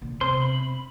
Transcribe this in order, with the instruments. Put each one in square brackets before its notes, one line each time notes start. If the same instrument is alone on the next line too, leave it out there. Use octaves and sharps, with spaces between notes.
[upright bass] A#2 D3
[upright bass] E1 C3 [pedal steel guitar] C5 C6
[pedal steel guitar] B5